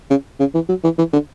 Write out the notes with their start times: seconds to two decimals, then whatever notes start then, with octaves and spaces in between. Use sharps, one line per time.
0.10 C#3
0.40 C#3
0.54 E3
0.69 F#3
0.84 E3
0.98 E3
1.13 D3